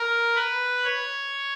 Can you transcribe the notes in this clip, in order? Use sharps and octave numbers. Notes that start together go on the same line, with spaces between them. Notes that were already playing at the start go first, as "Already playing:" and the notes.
Already playing: A#4
B4
C#5